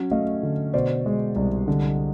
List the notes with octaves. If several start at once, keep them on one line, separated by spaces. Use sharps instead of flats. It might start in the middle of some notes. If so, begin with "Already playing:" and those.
Already playing: F#3 C#4
A3 D#5 F5
D3
B2 C5 D5
G#3
C2
D3